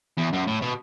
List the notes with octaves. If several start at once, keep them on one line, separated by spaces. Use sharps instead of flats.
E2
F#2
A2
B2